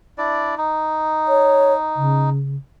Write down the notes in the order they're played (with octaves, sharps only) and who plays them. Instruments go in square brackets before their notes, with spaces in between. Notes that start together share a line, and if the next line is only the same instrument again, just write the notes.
[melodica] D4 E4 D5
D#4
[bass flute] C#5
C#3